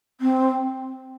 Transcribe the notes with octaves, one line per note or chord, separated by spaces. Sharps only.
C4